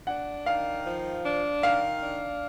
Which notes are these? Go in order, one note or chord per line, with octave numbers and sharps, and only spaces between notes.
D4 F#5
D#3 F5
F3
D4
D#3 F5
D4